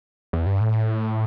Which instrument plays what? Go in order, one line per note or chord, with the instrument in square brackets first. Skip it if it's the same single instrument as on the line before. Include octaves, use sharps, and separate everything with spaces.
[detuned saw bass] E2
G2
A2